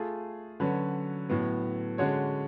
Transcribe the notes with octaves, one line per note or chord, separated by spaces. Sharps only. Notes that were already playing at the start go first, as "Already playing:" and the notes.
Already playing: A3 F4 G#4
D3 F#3 C#4 F#4 B4
A2 F#3 B3
D3 G#3 C#4 F#4 C#5